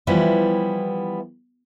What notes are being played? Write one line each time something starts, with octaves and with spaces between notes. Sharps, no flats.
E3 F3 G3 B3 E4